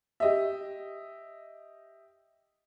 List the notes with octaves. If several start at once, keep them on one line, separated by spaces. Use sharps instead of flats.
G4 D#5 E5